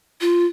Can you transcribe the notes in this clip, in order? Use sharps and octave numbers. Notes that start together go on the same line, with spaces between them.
F4